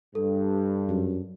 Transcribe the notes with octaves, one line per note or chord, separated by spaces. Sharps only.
G2 A4
F#2